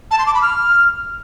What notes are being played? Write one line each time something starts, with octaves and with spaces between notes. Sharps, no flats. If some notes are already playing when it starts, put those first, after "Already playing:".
A5
C6
D6
B5
F6